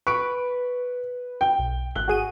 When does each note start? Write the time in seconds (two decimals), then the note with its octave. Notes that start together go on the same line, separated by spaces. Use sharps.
0.07 B4 C#6 D7
1.41 G5
1.59 B1
1.96 G#1 F#6 G7
2.08 G#1 F#4 G#4 D#7